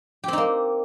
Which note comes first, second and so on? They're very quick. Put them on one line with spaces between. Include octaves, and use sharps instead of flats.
G4 C4 D#4 A#3